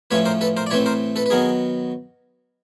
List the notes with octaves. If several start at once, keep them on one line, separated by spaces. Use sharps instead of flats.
A2 F3 A3 C#4 B4 C#5
A#4 C5
A4 B4
A#4 C5
D5
A2 E3 A3 C4 B4 C#5
A#4 C5
A4 B4
B4
D#3 F#3 B3 G#4 A#4